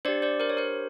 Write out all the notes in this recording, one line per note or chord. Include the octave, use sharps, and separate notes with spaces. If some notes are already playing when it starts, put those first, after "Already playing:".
D4 G4 C5 D5
C5 D5
A#4 C5
C#5
A#4 C5